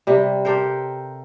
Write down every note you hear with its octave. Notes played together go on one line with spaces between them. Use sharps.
C3 G3
G4 A4 A#4 C5